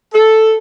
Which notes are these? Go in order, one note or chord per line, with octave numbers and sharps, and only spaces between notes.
A4